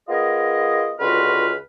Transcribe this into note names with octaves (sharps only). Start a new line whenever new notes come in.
B3 F4 G#4 A#4 D#5
C#2 D3 F4 F#4 B4 F6